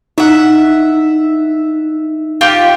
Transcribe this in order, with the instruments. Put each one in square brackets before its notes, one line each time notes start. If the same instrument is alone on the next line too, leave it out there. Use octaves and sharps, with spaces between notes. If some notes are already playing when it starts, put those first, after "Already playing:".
[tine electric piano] D#4 [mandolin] E5 F#5
[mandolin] F4 G4 G5